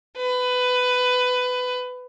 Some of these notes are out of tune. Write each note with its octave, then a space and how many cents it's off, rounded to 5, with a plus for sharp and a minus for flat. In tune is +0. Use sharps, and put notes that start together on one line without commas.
B4 +15